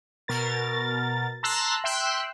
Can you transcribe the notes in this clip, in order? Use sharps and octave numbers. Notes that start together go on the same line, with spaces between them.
B2 A#4 A6
A5 A#5 C6 E6 F#6
E5 G5 C6 E6 F#6